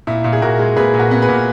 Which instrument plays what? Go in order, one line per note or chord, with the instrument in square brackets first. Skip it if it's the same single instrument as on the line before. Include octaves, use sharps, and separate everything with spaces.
[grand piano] A#2 E4
A#2
G#4
A#2 F#4 A#4
G#3
A#2 G#4 B4
A#2
F#4 A#4
B3
G#4 B4
A#2